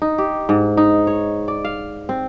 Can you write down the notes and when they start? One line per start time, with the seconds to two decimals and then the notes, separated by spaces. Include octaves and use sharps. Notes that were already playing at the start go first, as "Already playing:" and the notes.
0.02 D#4
0.18 G4
0.49 G#2
0.77 D#4
1.07 C#5
1.48 D5
1.64 F5
2.09 C4